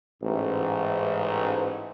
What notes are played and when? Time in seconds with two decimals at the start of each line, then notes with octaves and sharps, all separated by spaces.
0.23 A1 G#2